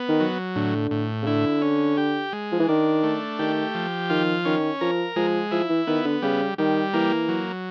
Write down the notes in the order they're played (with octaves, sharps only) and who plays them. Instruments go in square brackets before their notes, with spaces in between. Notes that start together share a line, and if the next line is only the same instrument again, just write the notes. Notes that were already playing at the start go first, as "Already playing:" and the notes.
Already playing: [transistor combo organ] B3
[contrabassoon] D#3
[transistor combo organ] F#3
[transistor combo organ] A2 [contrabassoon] D3
[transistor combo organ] A2
[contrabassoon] C#3
[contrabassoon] D3 [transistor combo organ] E4
[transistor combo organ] C#4
G4
G#3
[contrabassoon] F3
E3
[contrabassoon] D#3 [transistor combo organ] D4
[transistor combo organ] A3
[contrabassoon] D#3 [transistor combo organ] G4
[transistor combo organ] F3
[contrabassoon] D#3 [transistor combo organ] F4
[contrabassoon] D#3 [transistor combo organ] C#4
[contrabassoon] F3 [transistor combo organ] A#4
[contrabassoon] F3 [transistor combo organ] G#3
[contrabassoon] F3 [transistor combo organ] E4
[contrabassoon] E3
[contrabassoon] D#3 [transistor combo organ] B3
[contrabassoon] D3
[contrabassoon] C#3 [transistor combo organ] G3
[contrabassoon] D#3 [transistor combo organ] G3
[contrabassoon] E3 [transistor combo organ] A#3
[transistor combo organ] F#3